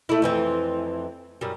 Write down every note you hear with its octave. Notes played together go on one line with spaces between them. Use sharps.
A3 E4
F2 E3 C4
F#2 G3